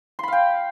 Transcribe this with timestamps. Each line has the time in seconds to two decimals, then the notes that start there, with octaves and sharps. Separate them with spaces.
0.19 C6
0.23 B5
0.28 F5
0.32 G5